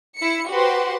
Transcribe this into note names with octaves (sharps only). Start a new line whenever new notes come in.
E4 C#7
F#4 G4 B4 C5 F#5 C6